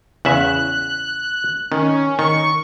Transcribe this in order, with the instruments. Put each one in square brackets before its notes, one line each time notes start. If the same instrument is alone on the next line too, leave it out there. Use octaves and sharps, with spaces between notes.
[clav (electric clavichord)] E2 C#3 E5 [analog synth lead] F#6
[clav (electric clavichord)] D#3 [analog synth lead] C#4
[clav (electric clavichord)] D#3 [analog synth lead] C#6